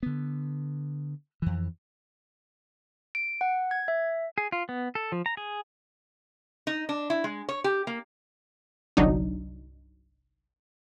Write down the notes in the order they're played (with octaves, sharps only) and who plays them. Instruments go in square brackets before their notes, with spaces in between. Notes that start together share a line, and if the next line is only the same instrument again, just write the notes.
[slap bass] D3 B3
F2 E3
[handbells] D7
F#5
G#6
E5
[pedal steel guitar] G#4
F4
B3
A4
F3
A#5
G#4
[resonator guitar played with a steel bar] D#4
D4
E4
G#3
C#5
G4
A#3
[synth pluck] G1 C2 F#3 D4 D#4